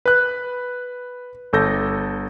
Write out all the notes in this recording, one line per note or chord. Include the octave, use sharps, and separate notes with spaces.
B4 F#6
G1 A4 G6 A#6